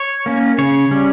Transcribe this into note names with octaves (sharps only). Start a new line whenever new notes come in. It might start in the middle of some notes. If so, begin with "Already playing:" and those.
Already playing: C#5
A#3 C#4
C#3 C#5
G3 C#4